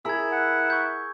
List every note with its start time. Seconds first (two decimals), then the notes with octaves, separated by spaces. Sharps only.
0.05 E4 G#4 A#4 E6 G#6
0.31 F#5
0.70 C#6 G6